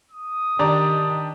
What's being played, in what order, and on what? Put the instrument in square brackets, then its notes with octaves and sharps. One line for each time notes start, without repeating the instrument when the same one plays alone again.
[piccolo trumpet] D#6
[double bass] D#3 [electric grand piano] D4 G4 A5 [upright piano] D5 A#5